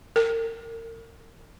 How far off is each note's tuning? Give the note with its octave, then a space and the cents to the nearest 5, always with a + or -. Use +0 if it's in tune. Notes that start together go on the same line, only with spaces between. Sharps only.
A#4 -35